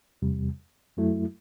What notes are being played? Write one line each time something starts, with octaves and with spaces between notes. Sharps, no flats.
E2 C3 G3
F#2 F#3 A3 E4